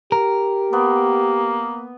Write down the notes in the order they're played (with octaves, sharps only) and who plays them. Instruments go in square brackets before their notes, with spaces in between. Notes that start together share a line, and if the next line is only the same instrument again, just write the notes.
[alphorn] G4 [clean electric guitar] A#4
[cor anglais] A#3 [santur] B3